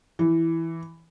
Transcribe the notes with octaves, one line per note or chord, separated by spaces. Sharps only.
E3